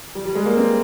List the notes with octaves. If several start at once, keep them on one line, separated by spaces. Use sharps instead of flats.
G3
G3
G#3
A#3
C4